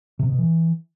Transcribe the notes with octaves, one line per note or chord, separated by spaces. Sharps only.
C3
B2
E3